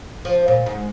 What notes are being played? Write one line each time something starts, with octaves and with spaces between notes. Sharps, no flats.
F3
A#2
G#2